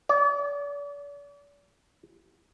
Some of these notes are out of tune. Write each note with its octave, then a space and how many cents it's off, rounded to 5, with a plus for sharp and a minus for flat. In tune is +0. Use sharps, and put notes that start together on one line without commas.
D5 -40